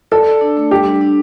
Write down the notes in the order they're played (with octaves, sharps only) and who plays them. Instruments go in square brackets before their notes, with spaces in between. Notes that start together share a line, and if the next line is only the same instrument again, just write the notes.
[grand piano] A4 [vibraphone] D5
[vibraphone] D5
D4
A3
[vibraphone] G3 [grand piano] G4
[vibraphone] D4
D4